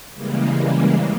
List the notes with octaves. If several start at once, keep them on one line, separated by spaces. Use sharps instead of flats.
C#3 E3 G3 G#3 A#3